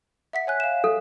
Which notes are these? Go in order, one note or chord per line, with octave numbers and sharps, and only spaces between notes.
E5 F#5 B6
C#5 G#5 F#6
F5 E7
A4